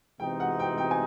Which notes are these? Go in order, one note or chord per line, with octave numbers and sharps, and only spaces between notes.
C3 E3 G#3 C4 D#4 G5
F#5
G5
G5
G#5